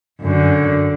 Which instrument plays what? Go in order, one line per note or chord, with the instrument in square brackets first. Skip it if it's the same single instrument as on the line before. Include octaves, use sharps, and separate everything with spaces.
[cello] F#2 D3